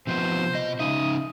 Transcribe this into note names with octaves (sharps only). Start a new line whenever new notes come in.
C3 F3 B3 C5
B2 D#5
C#3 D#4 E5 D#6